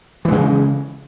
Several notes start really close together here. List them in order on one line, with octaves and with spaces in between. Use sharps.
E3 G#3 C#3